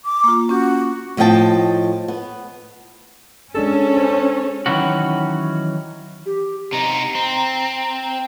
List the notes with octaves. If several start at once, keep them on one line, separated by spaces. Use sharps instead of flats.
D6
A#3 F4
C#4 F#4 G6
A2 F3 D#5 F#5 G5 A5
B3
G#3 C#4 D4 G#4 A4
C5
D#3 E3 F#3 C#4 F#4
G4
C3 D#4 A#5
C4